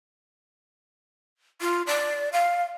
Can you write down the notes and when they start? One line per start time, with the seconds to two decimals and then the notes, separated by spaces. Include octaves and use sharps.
1.61 F4
1.87 D5
2.33 F5